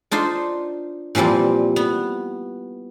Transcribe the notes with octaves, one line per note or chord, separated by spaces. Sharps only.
D4 D#4 F4 C5
A#2 E3 F3 G3 C4
B3